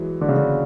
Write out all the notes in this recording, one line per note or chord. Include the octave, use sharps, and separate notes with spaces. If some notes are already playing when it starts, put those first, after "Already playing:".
Already playing: E3 F#3 G#3
D3
C#3
D3